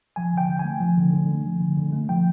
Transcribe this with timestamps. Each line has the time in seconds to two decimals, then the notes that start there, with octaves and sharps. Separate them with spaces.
0.16 F3 G#5
0.33 D3 G5
0.49 D3
0.59 G#5
0.65 A3
0.81 F3
0.97 D3
1.13 D3
1.29 A3
1.46 F3
1.61 D3
1.77 D3
1.93 A3
2.09 F3 G5